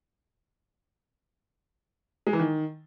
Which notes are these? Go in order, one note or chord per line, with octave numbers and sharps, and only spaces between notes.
G#3
E3
D#3